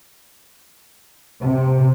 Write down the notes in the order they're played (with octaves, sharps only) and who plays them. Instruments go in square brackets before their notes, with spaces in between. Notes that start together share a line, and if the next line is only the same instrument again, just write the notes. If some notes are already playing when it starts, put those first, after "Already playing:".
[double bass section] C3